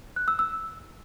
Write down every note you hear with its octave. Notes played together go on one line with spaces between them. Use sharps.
F#6
E6
E6